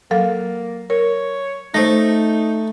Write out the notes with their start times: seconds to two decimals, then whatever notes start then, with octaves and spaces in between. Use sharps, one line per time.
0.11 F#3 A#3 A4 F5
0.90 A#4 C#5
1.74 A3 D#4 C5 A#6